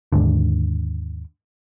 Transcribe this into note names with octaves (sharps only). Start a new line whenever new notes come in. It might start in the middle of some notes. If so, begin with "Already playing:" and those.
D#2 G#2 D3